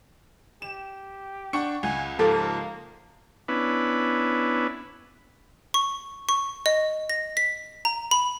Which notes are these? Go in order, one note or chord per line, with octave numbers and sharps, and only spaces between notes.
G4 E7
D4 F#5 G5 C#6 C#7
C#2 F#5 G#5
G#2 F3 A#3 G4 A4
B3 C#4 D4 E4 B4
C#6
C#6
D#5
A#6
B6
A#5
B5